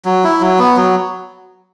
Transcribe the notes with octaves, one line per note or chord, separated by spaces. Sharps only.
F#3
E4
F#3
B3
F#3